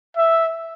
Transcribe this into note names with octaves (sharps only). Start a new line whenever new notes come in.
E5